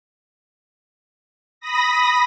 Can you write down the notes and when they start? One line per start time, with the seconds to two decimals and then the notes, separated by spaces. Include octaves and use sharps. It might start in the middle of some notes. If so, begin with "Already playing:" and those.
1.60 B5 D#6 A#6